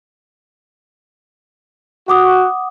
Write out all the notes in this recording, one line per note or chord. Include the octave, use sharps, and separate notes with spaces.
F#4 F#5 D6 D#6